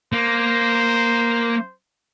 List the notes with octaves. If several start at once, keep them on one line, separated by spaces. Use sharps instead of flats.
A#3 C5